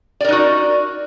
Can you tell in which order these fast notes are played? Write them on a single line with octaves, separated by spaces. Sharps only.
D5 A#4 D#4 F#4